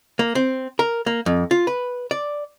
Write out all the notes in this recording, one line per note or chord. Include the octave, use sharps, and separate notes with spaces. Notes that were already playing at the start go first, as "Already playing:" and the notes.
A#3
C4
A#4
A#3
F2
F4
B4
D5